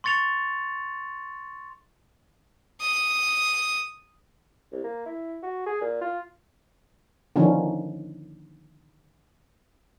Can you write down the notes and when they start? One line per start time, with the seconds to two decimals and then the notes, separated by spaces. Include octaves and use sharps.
0.04 C6 C#6 A6 C#7 F7
2.81 D#6
4.72 C2
4.84 A#3
5.06 E4
5.43 F#4
5.66 G#4
5.81 A#2
6.01 F4
7.36 D3 D#3 F3 C#4